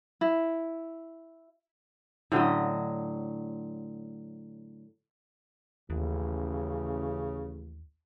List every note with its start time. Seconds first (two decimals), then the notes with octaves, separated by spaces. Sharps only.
0.21 E4
2.32 A2 D3 F#3 D#5
5.90 A1 D#2 C#3